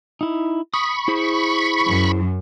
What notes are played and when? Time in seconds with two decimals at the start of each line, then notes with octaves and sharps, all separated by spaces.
0.21 D#4 E4
0.74 B5 C#6 D#6
1.08 E4 G#4 C5
1.87 F#2